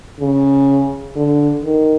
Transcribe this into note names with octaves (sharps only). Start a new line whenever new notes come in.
C#3
D3
D#3